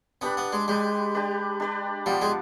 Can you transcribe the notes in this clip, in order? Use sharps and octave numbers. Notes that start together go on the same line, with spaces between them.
B3 D4 G4 B4 D5
B3
G#3
G#3 D4 G4 B4 D5
D4 G4 B4 D5
D4 G4 B4 D5
F3 G3 B3 F4
G#3